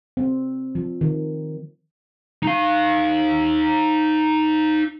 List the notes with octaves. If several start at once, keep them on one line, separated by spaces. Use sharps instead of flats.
C4
F3
D#3
D#4 F5